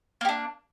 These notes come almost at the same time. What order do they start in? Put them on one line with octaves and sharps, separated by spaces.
A#3 G4 D4